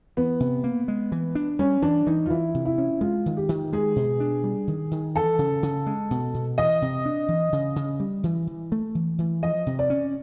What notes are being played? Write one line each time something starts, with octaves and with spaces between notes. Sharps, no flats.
E3 B3
C3
A#3
G#3
E3
D4
G3 C#4
E3 D4
E3 D#4
F4
E3 E4
C3
E4
C#4
G#3 F4
D#3
G4
D#3
G#3 G#4
B2
D4
G3
D#3
D#3
E3 A4
C#3
C#3
G#3
B2
B2
E3 D#5
C3
D4
E3
C#3
C#3
G3
E3
E3
A3
E3
E3
F3 D#5
C3
D5
C#4